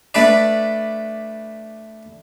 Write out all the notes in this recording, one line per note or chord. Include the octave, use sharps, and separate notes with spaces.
A3 D4 B4 D5